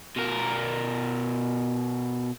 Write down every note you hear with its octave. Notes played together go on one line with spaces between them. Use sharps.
B2 A#4